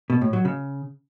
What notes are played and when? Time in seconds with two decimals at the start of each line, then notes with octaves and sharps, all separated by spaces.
0.10 B2
0.21 A2
0.33 F#3
0.45 C#3